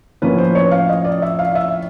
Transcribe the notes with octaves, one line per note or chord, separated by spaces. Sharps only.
A2 F3 A#3 C#4 B4
C5
C#5
F5
D#5
D5
E5
F5
E5